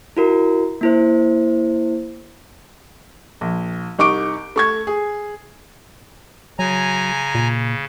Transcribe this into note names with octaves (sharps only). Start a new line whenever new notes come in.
E4 F#4 A#4
A#3 E4 C5
A#1
C2 D#4 C#6 D6 D7
A3 C#6 G#6
G#4
C#3 F#3 G#5 A#5
A#2